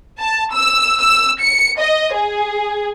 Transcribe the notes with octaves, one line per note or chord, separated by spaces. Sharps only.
A5
E6
E6
C#7
D#5
G#4